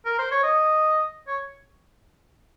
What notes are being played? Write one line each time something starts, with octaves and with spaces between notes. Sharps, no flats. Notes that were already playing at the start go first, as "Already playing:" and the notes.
A#4
C5
C#5
D#5
C#5